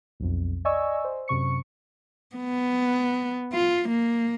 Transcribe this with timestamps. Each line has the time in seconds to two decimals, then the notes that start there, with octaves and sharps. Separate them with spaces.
0.20 B1 F2
0.65 D5 D#5 G#5 C#6 E6
1.04 C5
1.28 F#2 C3 C#6 C#7
2.36 B3
3.53 F4
3.89 A#3